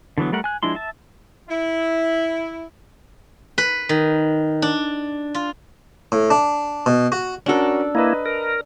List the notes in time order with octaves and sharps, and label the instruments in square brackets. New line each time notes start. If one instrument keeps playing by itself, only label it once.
[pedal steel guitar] D3 E3 F#3 B3
G3 A3 A#4 F#5
G#5 F#6
F3 G#3 D4 E4 C6
E5 A5
[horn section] E4
[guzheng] B4
D#3
D4
F4
[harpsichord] A2
D4
B2
F#4
[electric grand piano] C#4 F#4 A#4 [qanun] D4 A4
[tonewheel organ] A#3 E4 [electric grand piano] B4 D#5 A#5
[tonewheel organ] A#4